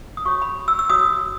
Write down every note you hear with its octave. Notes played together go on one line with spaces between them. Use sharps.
D#6
F#4 C#5 C#6
B5
E6
E6
F#4 C#5 D#6